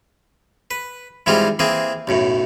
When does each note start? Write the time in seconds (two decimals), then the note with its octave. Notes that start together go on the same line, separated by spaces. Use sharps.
0.71 B4
1.26 G#2 E3 G3 G#3 C4 F4
1.59 E3 A#3 C4 G#4
2.07 B1 F#2 A2